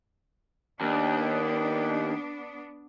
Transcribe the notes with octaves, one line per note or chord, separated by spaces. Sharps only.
D#2 B3 D4